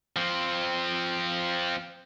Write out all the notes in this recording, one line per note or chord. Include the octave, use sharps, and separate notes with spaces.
F3 C4